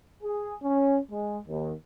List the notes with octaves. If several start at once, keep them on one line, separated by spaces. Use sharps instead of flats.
G#4
C#4
G#3
D#2